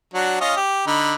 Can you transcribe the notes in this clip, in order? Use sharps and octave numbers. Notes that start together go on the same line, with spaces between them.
F#3 D4 F#4
C#4 F4 D#5
G4
D3 D#4 B5